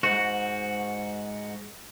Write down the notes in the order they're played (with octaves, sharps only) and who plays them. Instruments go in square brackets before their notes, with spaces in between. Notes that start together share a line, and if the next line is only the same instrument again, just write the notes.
[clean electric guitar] G#2 F#4